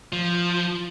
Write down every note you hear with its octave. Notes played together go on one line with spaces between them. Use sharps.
F3